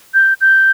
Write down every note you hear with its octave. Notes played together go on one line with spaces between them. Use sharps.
G6
G6